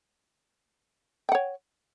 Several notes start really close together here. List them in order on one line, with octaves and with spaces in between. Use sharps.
G5 F#5 C#5